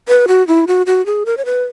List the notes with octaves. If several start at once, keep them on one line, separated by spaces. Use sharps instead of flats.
B4
F#4
E4
F#4
F#4
G#4
A#4
C#5
B4